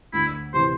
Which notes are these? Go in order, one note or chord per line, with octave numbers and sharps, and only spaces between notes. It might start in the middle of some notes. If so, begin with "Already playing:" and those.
D2 E4
C3 E3 C5